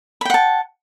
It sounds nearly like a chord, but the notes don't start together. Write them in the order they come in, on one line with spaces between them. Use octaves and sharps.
B5 G5 F#5 A5